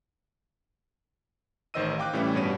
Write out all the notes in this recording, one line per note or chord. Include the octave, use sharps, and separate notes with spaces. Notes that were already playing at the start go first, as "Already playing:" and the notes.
A1 D#3 C5 D#5 E6 D#7
F5 G5 D6 F#6
A2 E3 G3 C#4 E4
G2 B2 G3 C#5 D#7